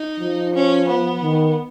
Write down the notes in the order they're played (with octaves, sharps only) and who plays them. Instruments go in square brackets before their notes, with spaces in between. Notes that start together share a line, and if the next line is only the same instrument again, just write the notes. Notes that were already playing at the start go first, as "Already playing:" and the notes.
Already playing: [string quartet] D#4
[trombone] F3
[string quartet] C#4
B3
[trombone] D#3